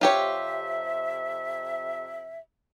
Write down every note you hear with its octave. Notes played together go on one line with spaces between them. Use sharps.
F2 C3 F4 G4 C#5 E5